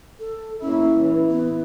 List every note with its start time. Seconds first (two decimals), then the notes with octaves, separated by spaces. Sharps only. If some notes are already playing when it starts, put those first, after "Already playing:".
0.19 A4
0.61 A#3 C#4 E4
0.98 E3
1.31 B3